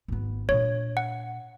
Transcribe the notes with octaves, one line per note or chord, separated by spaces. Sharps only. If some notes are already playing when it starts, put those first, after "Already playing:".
G#1 B3
A#2 D4 C#5
F#5